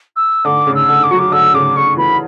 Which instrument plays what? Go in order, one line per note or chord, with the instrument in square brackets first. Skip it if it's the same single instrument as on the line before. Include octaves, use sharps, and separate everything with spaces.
[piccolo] E6
[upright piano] D3 [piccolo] D6
[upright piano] C#3
[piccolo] E6
[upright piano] D3
[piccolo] D6
[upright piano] F#3 [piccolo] C#6
[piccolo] D6
[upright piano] D3 [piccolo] E6
[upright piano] C#3 [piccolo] D6
[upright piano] D3 [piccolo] C#6
[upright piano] E3 [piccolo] B5